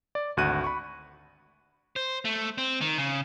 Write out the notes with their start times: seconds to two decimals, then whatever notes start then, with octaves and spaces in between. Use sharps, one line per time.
0.15 D5
0.37 G#1 D2 F#4 F#6 D#7
0.64 B5 C#6
1.96 C5
2.25 A3
2.58 C4
2.81 D#3
2.98 C#3